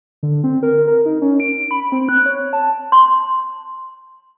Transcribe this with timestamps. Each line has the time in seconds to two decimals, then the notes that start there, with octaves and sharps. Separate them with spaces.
0.23 D3
0.44 C4
0.63 A#4
0.87 A#4
1.06 D#4
1.22 C#4
1.40 D7
1.71 B5
1.92 C4
2.09 F#6
2.26 C#5
2.53 A5
2.92 C6